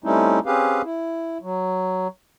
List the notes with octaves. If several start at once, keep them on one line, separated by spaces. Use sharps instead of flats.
G3 A3 C4 C#4 D#4 E4
C4 C#4 G4 G#4 B4 F5
E4
F#3